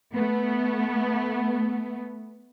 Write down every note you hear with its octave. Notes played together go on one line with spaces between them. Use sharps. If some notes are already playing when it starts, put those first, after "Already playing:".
A3 B3